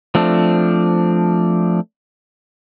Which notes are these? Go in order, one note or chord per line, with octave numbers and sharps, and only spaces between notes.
F3 A3 C4 D4